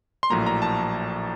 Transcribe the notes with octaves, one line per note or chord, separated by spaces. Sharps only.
C6
A#1 A2 F#3 A#3 A#5
A#5
A5